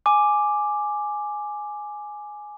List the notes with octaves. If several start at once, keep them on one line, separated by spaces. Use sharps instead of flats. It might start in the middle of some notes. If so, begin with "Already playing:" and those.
G#5 D6